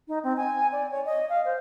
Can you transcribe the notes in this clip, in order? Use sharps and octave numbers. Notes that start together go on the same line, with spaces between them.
D#4
C4
G#5
D5
C#5
D#5
F5
C5